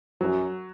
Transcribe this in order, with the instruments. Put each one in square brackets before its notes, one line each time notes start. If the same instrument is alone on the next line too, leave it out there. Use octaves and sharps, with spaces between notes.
[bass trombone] F#2 [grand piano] F#3